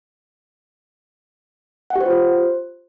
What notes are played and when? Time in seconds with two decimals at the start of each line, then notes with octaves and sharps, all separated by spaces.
1.90 F#5
1.96 G4
2.01 C5
2.06 F4
2.11 C5